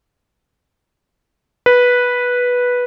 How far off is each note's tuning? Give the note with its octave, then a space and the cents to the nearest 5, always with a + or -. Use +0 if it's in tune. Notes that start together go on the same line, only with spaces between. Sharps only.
B4 -10